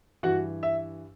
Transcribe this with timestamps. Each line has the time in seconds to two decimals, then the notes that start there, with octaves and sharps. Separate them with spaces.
0.23 G2 E3 F#4 F#5
0.63 E5